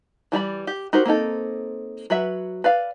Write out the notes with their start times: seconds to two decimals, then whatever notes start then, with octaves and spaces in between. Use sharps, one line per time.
0.32 E3 G3 D5 B5
0.67 G4
0.93 D#4 F#4 G4 A#4 C5
1.05 A#3 C4 D#4 A4
2.10 F#3 B4 E5
2.64 B4 D5 F5